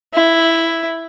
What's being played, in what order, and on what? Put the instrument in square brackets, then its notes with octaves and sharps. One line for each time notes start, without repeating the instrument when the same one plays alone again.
[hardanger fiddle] E4